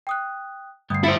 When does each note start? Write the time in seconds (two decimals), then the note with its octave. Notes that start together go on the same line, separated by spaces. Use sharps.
0.07 G5 D#6 F#6
0.90 D2 G2 D#6 C7
1.04 E4 C5 A6 C#7 D7